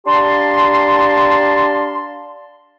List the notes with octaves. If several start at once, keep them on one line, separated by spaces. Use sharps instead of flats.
D4 G4 F5 A5 A#5 C6